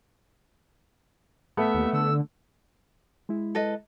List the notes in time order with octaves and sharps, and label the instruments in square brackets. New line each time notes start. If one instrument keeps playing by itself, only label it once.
[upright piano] A3 B3 [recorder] E5
[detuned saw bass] D#2
[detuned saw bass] D3 [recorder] E6
[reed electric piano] G#3 E4
[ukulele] A4 B4 D#5